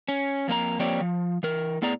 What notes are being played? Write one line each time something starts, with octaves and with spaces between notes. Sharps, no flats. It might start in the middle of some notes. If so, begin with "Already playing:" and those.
C#4
F2 A#3 D4 A#5
F3 A#3 C4 G4 C#5 D5
F3
E3 A#4
A2 B3 G#4 D5 A#5